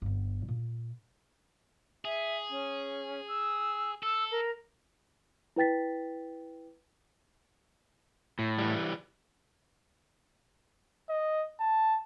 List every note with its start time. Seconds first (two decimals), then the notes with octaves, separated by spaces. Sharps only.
0.02 G1 C4
0.48 A#2
2.05 G#4 E5
2.50 C#4
3.28 E6
4.03 A4 E6
4.31 A#4
5.56 E4 B4 G5 A6 B6
8.39 A2
8.59 E3 G3
11.09 D#5
11.60 A5